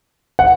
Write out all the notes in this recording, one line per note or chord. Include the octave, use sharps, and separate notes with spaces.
F#5